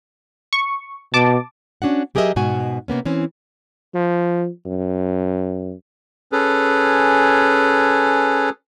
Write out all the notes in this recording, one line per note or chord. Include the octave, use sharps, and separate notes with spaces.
C#6
B2 A5 D6
C#4 D4 F#4 F#5
F#3 G4 G#4 A#4 D#5 E5
G#2 B2 F#4 G#5
C3 A#3 B3 C#4
E3 C4 C#4
F3
F#2
C#4 G#4 A4 B4